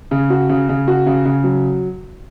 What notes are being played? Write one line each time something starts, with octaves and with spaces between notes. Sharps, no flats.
C#3
F#4
C#3
C#3
F#4
C#3
C#3
F#3